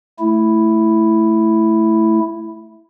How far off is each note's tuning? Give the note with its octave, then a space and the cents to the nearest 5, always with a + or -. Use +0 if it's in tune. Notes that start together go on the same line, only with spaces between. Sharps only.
A3 +0 E4 +0